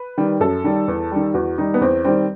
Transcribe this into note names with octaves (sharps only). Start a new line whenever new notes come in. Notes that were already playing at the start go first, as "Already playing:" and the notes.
Already playing: B4
D#3 G3
F#2 A4
D#3 G3
E2
D#3 G3
E2 F#4
D#3 G3 D#4
B3
E2 C4
D#3 G3 C4